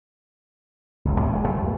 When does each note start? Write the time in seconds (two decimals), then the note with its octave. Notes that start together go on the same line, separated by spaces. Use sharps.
1.05 F#1 C#2
1.20 D#2 A2 E3 B3
1.32 F1 D#2 A#2 G#3
1.48 F#2 F3 G3
1.65 E2 A3